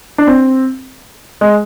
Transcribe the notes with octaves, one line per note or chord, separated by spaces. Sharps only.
D4
C4
G#3